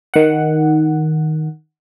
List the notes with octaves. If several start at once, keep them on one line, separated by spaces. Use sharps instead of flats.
D#3 F#5